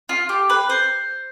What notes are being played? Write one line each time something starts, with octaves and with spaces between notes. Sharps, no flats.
F4
G4
B4
C5